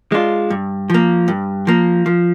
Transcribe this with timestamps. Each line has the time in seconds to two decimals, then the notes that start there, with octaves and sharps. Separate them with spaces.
0.12 G#3 D4 F4
0.50 G2
0.90 F3 A#3
1.28 G2
1.67 F3 A#3
2.06 F3